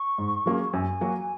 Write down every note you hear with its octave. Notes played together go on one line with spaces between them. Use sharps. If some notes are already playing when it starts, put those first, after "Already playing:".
Already playing: C#6
G#2
F#3 A#3 C#4 G#4
F#2 G#5
F#3 A#3 F#4